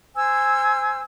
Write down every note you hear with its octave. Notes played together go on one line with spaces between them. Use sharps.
C5 G#5 E6